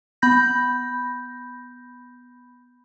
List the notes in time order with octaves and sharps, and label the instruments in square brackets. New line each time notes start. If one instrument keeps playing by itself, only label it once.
[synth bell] B3 B5 G6 A#6